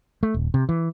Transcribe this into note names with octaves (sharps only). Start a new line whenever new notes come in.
A3
D#1
C3
E3